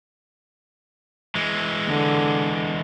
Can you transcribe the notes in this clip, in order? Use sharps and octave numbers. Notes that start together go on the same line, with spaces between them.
E3 G#3
D3